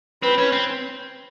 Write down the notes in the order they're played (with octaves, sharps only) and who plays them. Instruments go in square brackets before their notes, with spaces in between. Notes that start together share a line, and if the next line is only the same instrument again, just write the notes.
[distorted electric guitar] C4 [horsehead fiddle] B4
[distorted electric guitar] C#4
C4